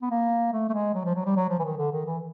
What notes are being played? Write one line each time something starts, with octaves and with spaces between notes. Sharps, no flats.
B3
A#3
A3
A3
G#3
F#3
F3
F#3
G3
F#3
F3
E3
D#3
D3
D#3
E3